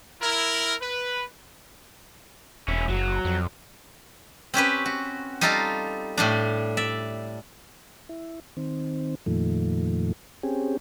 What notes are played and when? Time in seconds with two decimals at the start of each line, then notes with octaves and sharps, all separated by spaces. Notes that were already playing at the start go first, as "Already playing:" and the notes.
0.22 E4 A#4
0.81 B4
2.68 E1 C#4 E4
2.89 F#1 F#3
3.25 F2
4.54 C4 C#4 G4 B4
4.86 F#4
5.41 G3 D#4 F4 A4 F5 A#5
6.18 A2 G3 D4
6.77 D5 E5
8.09 E4
8.57 D#3 C4
9.26 F2 A#2 D#3 F3 A3
10.43 C4 C#4 G4 G#4